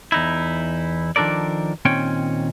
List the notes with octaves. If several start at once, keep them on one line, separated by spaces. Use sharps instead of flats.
E2 D#4 E4
D#3 F3 D4 A4 A#4 D5
A#2 D#3 C4 C#4 C#5 G5